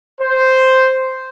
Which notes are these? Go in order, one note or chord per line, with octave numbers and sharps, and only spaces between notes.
C5